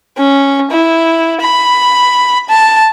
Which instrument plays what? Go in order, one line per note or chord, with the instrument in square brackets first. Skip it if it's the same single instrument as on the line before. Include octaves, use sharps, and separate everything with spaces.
[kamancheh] C#4
E4
B5
A5